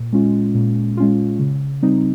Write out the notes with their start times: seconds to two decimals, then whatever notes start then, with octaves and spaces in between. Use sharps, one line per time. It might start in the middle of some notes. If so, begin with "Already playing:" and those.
Already playing: A#2
0.13 G#3 C#4 F4
0.55 A#2
0.97 G#3 C#4 F4
1.39 C#3
1.82 G3 C4 D#4